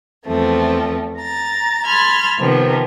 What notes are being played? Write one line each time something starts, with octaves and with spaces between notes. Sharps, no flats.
E2 F3 A3 C4
A#5 A6
A5 B5 C6 F6 G#6
C3 D#3 F3 A#3 B3